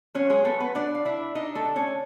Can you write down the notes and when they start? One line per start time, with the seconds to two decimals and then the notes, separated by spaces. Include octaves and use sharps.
0.14 F#3 C#4 C#5
0.30 G#3 G#4
0.45 A3 B3 A4
0.60 B3 B4
0.75 B3 D4 D5
0.95 F5
1.05 D4 E4 E5
1.35 D4 D#4 D#5
1.55 A3 A4
1.65 D3
1.76 C#4 C#5